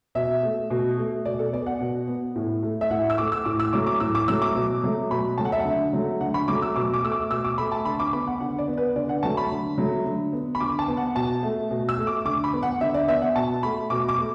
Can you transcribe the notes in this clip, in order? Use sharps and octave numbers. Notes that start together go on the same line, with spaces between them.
B2 E5
A3
B2
A3
B2 D5
A4
B3 D5
F#5
B2
B3
A2
A3
E5
A2 F#5
E6
A3 D6
E6
A2 D6
E6
F#3 A3 D6
D6
A2 E6
D6
F#3 A3 E6
D6
B2
F#3 A3
B2 B5
F#3 A3 A5
F#5
E5
F#5
D3
F#3 A3
D3 F#5
B5
F#3 A3 D6
E6
B2 D6
D6
A3 E6
D6
B2 E6
D6
A3 B5
A5
D3 B5
D6
B3 B5
F#5
D3 F#5
D5
B3
B4
D3 D5
F#5
F#3 A3 A5
B5
D3
F#3 A3
D3
B3
B5
D3 D6
A5
B3
F#5
B2 A5
A3
B2
E6
A3
D6
D3 D6
B5
B3
F#5
D3 E5
D5
B3 E5
F#5
B2 A5
A3 B5
B2 D6
D6
A3